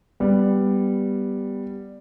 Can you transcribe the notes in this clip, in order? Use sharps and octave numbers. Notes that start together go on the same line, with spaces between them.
G3 B3